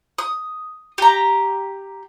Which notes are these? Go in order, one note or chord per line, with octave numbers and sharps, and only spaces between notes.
D#6
G4 A#5